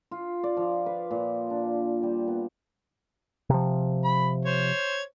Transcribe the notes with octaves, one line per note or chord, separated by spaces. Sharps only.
F4
D5
F3
B4
A#2
D4
G3
B3
C3 F3
B5
C5 C#5